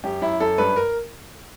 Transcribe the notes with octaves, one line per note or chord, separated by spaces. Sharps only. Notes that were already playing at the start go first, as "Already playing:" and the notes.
F#2 G4
F#2 E4
F#2 A4
G2 B4
A#4